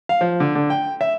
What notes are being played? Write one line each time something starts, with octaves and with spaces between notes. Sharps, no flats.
F5
F3
D3
D3
G5
E5